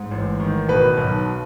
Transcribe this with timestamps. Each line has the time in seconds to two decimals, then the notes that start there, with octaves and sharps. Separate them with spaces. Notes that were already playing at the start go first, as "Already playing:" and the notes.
Already playing: G#2
0.11 A1
0.40 D#3
0.68 B2 B4
0.97 B1